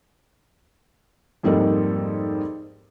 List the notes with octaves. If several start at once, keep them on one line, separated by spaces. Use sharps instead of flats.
F2 G#2 G3 A#3 A4 D#5